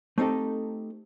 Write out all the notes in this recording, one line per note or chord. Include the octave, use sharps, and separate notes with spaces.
A3 C4 D#4 G4 A4